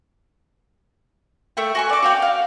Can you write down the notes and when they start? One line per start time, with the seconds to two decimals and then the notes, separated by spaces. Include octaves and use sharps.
1.57 A3 E5 G5
1.75 F#4 G#5 C#6
1.89 D5 D6
2.02 F#4 F5 G5
2.22 F5